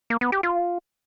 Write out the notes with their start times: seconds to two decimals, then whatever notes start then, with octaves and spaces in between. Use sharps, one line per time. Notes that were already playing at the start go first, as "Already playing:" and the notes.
0.10 A#3
0.21 B3
0.32 G4
0.43 F4